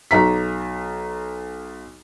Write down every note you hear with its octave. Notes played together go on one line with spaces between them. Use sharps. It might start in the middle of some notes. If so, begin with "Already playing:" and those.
B1 A#5 B6